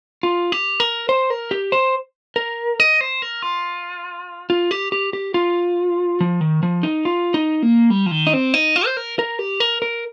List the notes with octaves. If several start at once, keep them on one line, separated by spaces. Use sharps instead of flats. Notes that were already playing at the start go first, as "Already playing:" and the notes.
F4
G4
A#4
C5
A#4
G4
C5
A#4
D#5
C5
A#4
F4
F4
G4
G4
G4
F4
F3
D#3
F3
D#4
F4
D#4
A#3
G3
F3
D#3
D#4
C4
D#4
F4
C5
A#4
A#4
G4
A#4
A#4